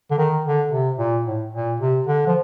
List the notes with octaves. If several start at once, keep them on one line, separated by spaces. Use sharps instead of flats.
D3
D#3
D3
C3
A#2
A2
A#2
C3
D3
F3